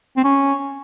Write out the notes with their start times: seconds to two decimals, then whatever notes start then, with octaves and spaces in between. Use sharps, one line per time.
0.17 C4
0.24 C#4